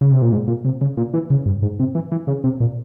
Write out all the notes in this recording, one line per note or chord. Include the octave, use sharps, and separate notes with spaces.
C#3
C3
A#2
G#2
A#2
C3
C#3
A#2
E3
C#3
G2
G#2
C3
E3
E3
C#3
C3
A#2